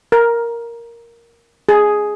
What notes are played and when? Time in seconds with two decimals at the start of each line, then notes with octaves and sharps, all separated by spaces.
0.12 A#4
1.69 G#4